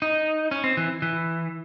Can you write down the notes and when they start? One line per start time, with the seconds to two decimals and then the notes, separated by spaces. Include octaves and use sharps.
0.02 D#4
0.51 C#4
0.64 C4
0.77 E3
1.02 E3